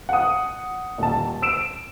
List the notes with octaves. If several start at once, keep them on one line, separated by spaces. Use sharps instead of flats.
F#5 D#6
D#1 A5
E6 D7 E7